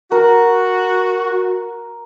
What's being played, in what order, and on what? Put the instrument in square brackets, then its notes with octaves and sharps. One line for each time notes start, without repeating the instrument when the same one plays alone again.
[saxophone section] F#4 [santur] A#4